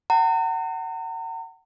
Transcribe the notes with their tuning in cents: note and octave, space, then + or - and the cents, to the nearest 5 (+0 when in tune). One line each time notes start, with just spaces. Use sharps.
F#5 +30 A#5 -40